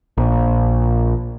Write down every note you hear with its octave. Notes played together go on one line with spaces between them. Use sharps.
A#1